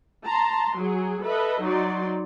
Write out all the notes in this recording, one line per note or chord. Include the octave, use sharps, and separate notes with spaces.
A5 A#5 C6
F#3 G#4
A4 B4 D#5 E5
F#3 D#4 D5 C6